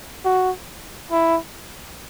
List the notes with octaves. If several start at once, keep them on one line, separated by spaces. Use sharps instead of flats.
F#4
E4